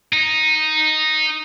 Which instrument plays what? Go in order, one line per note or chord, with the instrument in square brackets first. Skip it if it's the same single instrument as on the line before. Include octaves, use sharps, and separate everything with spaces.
[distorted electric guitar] D#4